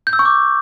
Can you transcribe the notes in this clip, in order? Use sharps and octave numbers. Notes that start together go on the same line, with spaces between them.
G6
E6
C#6
D6